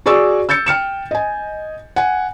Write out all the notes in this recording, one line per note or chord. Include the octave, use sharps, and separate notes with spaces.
F#4 G#4 D5 C#6 E6
E6 G6 A6 C#7
G5 F6 C#7 E7
D#5 G#5
F#5 G#5